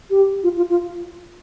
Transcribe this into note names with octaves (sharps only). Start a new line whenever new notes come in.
G4
F4
F4
F4